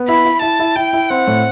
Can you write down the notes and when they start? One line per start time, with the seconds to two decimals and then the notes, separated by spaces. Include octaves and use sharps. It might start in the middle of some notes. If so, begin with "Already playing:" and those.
Already playing: B3
0.08 E4 B5
0.25 E4
0.42 E4 A5
0.59 E4
0.76 E4 G5
0.93 E4
1.10 C4 F#5
1.27 A2